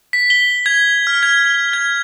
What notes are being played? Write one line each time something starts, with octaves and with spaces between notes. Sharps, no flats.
B6
G7
G#6
F6
G#6
G#6